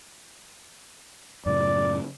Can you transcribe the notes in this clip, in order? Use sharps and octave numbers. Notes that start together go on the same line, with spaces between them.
F#2 A2 C#3 D5